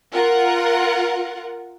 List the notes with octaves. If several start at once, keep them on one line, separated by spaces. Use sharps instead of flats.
F4 A#4 F#5